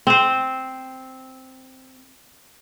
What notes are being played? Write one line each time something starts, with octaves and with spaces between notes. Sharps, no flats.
C4 C5